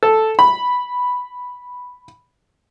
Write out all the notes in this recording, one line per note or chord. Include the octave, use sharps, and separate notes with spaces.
A4
B5